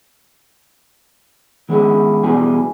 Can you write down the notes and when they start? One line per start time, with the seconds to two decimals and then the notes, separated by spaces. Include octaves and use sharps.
1.69 D#3 G#3 B3 C#4 E4 G#4
2.24 B1 B2 E3 G3 G#4 G#5